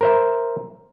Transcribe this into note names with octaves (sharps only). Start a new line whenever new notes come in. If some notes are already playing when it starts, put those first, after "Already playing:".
A#4 C5 E5